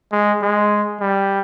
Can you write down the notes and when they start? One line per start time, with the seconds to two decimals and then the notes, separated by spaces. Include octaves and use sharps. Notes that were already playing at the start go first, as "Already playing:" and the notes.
0.12 G#3
0.42 G#3
1.00 G3